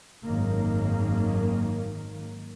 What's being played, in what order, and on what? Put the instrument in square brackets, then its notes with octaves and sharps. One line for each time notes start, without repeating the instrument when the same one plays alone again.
[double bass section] G#1 F#2 D#3 A#3